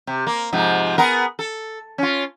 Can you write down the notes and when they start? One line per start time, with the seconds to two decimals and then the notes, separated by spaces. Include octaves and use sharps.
0.07 C3
0.27 A#3
0.53 G#2 C3 F3
0.98 B3 G#4 A#4
1.39 A4
1.98 C#4 F4